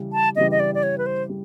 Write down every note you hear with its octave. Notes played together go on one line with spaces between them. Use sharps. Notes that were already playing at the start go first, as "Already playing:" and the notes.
Already playing: C#3 E3 G3
A5
C#3 E3 G3 D#5
D#5
D5
D5
C#5
B4
C5
G3